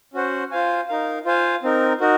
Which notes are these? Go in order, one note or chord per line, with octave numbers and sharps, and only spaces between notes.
C#4 F#4 C5 F#5
F4 C5 F5 G#5
D#4 A#4 F5
F4 C5 F5 G#5
C4 D#4 A#4
D#4 F#4 A#4